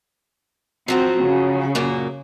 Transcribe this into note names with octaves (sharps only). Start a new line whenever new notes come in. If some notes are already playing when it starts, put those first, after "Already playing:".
F3 F#3 C4 F#4
C#3
F#2 A#2 A#3